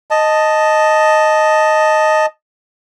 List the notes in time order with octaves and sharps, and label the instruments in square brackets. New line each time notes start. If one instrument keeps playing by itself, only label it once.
[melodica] D#5 A5